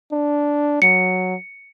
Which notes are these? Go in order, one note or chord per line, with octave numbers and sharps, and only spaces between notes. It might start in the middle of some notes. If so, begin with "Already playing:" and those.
D4
F#3 C#7